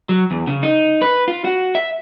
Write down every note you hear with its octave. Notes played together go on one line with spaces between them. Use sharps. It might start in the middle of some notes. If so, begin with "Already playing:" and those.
F#3
E2
C#3
D#4
B4
F4
F#4
E5